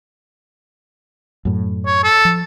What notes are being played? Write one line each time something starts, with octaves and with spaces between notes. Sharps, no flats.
F#2 A2
C#5
A4
F3